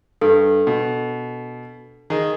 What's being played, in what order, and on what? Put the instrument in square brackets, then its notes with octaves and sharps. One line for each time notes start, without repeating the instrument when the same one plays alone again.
[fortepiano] G2 [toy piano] D4 A4
[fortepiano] B2
D#3 G#4 D#5